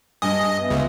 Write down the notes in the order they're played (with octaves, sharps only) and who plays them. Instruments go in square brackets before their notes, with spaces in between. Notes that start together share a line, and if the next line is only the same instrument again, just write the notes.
[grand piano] G2 G#5 [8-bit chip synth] D#5
[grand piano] B3 E5
[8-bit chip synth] C#2